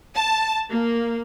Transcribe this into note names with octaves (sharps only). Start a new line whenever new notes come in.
A5
A#3